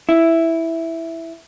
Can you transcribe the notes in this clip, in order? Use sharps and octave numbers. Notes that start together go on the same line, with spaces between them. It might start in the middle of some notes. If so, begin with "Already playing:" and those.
E4